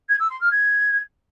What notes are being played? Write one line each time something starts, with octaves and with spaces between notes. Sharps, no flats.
G#6
E6
C6
F6
G#6